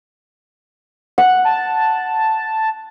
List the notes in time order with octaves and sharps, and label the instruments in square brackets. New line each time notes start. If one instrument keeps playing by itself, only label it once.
[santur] F#5
[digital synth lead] A5